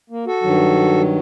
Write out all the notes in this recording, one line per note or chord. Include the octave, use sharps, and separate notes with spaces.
A#3
F#4 A4
G2 D#3 F#3